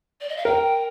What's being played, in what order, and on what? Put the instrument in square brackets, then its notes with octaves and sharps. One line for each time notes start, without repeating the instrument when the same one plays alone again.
[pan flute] D5
D#5
F5
[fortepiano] A#4 [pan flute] G5